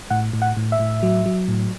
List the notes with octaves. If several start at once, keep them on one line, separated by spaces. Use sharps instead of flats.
A2 F#5
A2
F#5
A2
E5
A2
F#3
F#3
A2